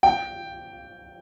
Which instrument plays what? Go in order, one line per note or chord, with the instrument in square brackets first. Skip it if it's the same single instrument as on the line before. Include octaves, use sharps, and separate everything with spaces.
[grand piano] G5